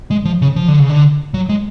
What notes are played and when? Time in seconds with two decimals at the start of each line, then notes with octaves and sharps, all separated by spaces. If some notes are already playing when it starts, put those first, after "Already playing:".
0.10 G#3
0.25 F3
0.42 C#3
0.56 F3
0.68 D3
0.79 C#3
0.90 D3
1.34 F#3
1.49 G#3